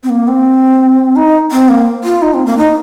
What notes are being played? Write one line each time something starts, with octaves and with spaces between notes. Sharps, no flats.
C4
A#3
C4
D#4
C4
A#3
F4
D#4
C4
A#3
D#4